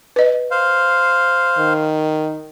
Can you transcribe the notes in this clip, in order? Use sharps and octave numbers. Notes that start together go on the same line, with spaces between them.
B4 D#5
C5 F5
D#3